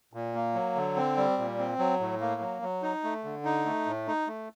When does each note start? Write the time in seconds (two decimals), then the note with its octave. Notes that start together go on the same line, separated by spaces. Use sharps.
0.13 A#2
0.35 A#3
0.55 F#3
0.76 D3
0.97 C4
1.17 G3
1.38 A#2
1.59 C4
1.79 F#3
2.00 A2
2.21 A#3
2.41 F#3
2.62 F#3
2.82 D#4
3.04 A3
3.24 D3
3.45 D#4
3.66 A3
3.86 A2
4.07 D#4
4.27 A3